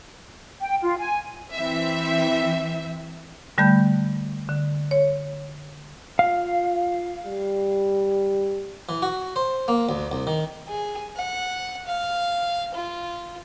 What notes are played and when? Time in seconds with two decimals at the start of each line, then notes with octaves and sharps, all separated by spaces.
0.61 G5
0.82 F4
0.98 G#5
1.53 E3 C4 E5
3.58 D3 G3 A3 B5 G6
4.49 D3
4.91 C#5
6.19 F4 F5
7.25 G3
8.89 E3
9.02 F#4
9.36 C5
9.68 A#3
9.89 D2
10.12 C2
10.27 D#3
10.68 G#4
11.16 F#5
11.87 F5
12.75 F4